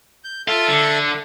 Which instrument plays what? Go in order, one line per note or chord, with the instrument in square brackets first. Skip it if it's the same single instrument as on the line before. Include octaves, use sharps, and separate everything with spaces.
[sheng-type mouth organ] G6
[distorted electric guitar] F4 [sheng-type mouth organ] A4 E5
[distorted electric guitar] D3